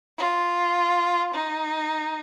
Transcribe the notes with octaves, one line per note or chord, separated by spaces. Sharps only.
F4
D#4